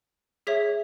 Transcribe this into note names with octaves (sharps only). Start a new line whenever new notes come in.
G#4 C#5 E5 B6